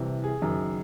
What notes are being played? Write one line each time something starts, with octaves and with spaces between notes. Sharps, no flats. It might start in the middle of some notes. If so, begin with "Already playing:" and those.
Already playing: C2 C3 E3
G#4
F#1 F#2 D#3